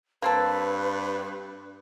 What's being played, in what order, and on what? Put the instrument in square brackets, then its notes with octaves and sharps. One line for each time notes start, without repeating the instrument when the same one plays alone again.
[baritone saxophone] G2 [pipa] A#3 C4 A4 [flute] B4